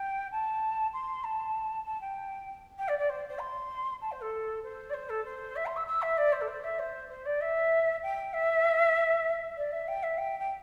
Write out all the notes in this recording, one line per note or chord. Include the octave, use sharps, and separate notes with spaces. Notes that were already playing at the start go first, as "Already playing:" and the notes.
Already playing: G5
A5
C6
A5
A5
G5
G5
D5
D5
C5
C5
C6
A5
C5
A4
C5
D5
C5
A4
C5
E5
C6
E6
E6
E5
D5
C5
A4
C5
E5
C5
C5
D5
E5
G5
E5
D5
E5
G5
E5
G5
G5